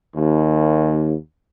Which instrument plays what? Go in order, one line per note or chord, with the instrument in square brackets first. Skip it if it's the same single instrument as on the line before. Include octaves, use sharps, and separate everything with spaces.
[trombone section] D#2